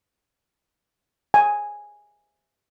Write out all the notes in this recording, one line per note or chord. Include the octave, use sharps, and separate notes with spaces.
G#5